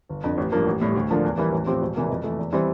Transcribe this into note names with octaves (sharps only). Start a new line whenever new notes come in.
G1
F2 D3
A1
G2 F3 A#3
A1
A2 G3
D2
D3 F3 A#3 D4
E2
E3 G3 A#3 E4
A1
A2 F3 C4 G4
E1
E2 C3 E3 A#3
F2
E3 A3
E2
E3 G3 C4